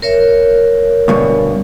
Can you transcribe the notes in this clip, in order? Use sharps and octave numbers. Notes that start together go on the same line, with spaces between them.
A#4 C#5 E5
D2 G2 B2